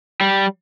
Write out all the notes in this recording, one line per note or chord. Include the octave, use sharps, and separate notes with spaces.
G3